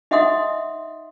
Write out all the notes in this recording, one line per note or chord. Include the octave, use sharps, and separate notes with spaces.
D#4 D#5 E5 F#5 C6 D#6